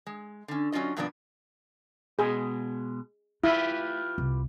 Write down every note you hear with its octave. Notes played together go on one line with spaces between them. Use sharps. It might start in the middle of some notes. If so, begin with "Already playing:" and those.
G#3
D3 C#4
F#3 C#4 D4 F4 D#5
G2 B2 F3 A#3 B3 D4
B2 G#3 G#4
A3 E4 F4 G4 B4
C2